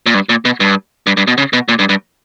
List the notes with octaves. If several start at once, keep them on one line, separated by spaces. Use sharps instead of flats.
A#2
G2
A#2
B2
G2
G2
G2
B2
C#3
B2
A#2
G2
G2